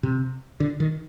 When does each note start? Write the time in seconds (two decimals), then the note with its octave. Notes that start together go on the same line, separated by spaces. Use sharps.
0.03 C3
0.60 D3
0.80 D#3